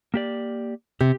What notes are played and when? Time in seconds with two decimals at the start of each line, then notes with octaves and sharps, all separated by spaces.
0.14 A#3 G4 D5
1.01 C3 G4